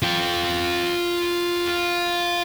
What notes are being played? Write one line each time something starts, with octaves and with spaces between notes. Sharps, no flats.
F4 G5